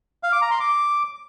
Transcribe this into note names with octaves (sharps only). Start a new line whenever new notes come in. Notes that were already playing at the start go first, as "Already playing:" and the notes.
F5
D6
A#5
C6
D6